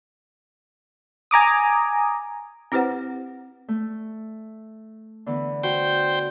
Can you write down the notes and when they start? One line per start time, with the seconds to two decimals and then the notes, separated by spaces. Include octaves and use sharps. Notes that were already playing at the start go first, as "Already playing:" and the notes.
1.31 G#5 A#5 D6 D#6
2.72 C4 E4 G4 B4 C5 F#5
3.68 A3
5.26 D3 E3 B3
5.64 F#4 C5 G5